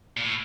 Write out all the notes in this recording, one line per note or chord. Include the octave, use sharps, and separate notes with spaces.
A#2
A2